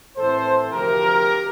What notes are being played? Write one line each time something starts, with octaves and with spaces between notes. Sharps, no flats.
A2 E3 A3 C4 A4 C5
D2 C3 F3 G4 A#4